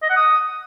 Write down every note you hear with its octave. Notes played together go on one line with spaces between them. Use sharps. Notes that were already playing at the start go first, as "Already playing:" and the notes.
D#5
F#5
D#6